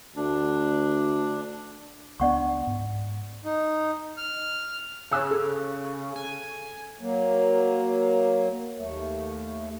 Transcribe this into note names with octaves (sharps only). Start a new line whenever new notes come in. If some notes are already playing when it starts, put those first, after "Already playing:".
D2 D4
C#2 B3 D4 D5 F#5 C#6
G#2
D#4
F6
C#3 G#5 E6 F#6
A4
G#5
F#3 A#3
D#2 A3